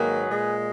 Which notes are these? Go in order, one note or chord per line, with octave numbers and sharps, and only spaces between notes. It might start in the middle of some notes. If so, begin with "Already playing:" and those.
Already playing: G#2 D#3 F#3 A#3 G#4 B4
A#2 G#3